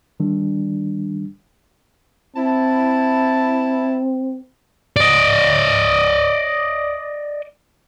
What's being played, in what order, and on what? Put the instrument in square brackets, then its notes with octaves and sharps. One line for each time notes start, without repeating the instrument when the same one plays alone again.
[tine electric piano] D#3 G3 D4
[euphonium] C4 [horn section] E4 A5
[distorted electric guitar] D5 D#5